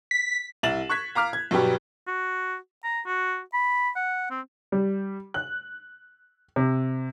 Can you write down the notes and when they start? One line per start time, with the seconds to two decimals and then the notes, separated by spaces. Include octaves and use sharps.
0.11 B6
0.63 C2 E4 A6 E7 F#7
0.89 C#6 F#6 G#6 B6
1.15 F5 A#5 D6 F6
1.33 G#6
1.51 G2 B2 F#3 G3 B3 G4
2.07 F#4
2.84 A#5
3.06 F#4
3.53 B5
3.96 F#5
4.30 C4
4.72 G3
5.34 F#6
6.56 C3